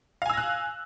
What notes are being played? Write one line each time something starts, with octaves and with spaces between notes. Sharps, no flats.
F5 G#5 E6 F#6 A#6